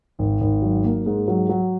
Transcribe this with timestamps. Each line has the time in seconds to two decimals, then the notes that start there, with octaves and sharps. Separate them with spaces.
0.19 G#1
0.41 G#1
0.62 F#3
0.84 A#3
1.06 G#2
1.28 F#3
1.49 F#3